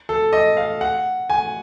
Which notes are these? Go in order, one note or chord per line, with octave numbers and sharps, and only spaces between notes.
A4
D#5
F5
F#5
G#5